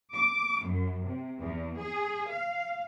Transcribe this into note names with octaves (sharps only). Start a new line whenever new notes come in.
D6
F#2
C3
E2
G#4
F5